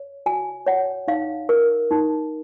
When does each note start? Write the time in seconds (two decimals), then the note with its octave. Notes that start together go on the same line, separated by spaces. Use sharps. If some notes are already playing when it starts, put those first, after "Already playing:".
Already playing: C#5
0.26 F#4 G#5
0.66 C#5 F#5
1.08 D#4 F5
1.49 A#4
1.91 D#4